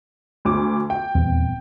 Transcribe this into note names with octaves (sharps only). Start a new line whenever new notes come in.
D2 D6
G5
D#1 E2 C4